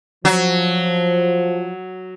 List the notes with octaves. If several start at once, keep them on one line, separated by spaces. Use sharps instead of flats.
F3 F#3